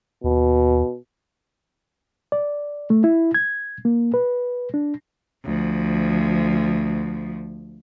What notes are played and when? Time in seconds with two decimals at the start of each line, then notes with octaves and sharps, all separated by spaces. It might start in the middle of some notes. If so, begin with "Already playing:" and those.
0.24 D#2 B2
2.32 D5
2.90 A3
3.04 E4
3.34 G#6
3.85 A#3
4.14 B4
4.74 D4
5.44 D2 F3